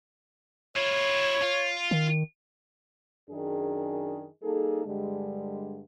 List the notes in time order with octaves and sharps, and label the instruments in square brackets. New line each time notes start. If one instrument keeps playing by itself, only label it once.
[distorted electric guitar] E4 F4 [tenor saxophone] C#5
[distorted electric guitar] F4
[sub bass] D#3
[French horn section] F#2 D#3 D4 G#4
G3 A#3 D#4 G#4 A4
G2 D3 G3 G#3